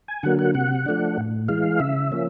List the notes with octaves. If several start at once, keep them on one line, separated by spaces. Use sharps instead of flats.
G#5
D3 F#3 A#3 F#5
F#5
C3 F#5
F3 A3 D4
A2
E3 G#3 F5
C#3 E5
F3 A#3 C#4